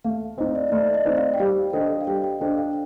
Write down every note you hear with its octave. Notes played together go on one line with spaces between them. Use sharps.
A3 F5
C4 D#4 D#5
D5
A3 D5
D#5
C4 D#4
F5
G5
G3 F5
D4 A4 C5 D#5 G5
F5
G3 G5
G5
D4 A4 C5 D#5 G5
F5